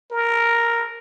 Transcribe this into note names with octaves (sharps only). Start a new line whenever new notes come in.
A#4